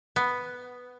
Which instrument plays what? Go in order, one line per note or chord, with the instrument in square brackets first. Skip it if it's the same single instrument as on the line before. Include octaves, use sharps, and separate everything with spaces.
[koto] B3